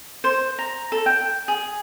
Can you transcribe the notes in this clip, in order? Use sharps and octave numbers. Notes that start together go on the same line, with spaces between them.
C5
A#5
A4
G5
G#4